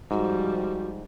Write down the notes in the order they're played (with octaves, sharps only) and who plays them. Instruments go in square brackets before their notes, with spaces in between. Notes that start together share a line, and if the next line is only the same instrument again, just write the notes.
[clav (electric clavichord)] G#2 [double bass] F3 G3 [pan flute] F#4